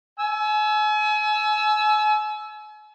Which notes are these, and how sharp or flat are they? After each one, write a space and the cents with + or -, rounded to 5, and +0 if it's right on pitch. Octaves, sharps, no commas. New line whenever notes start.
G#5 +40 E6 +0